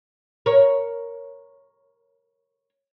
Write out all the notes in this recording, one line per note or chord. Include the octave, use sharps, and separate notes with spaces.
A#4 C#5